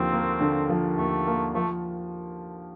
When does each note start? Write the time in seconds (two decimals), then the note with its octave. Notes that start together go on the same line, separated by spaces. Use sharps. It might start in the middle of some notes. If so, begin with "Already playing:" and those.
Already playing: D#2 D3 F3 C4
0.12 A#3
0.41 D3
0.69 F3
0.98 D#2 A3
1.26 A#3
1.54 F3 A3